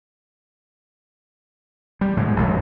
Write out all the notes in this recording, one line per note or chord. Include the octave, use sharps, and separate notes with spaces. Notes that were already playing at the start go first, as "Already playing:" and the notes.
G3
A2 D3 G#3
A1 F2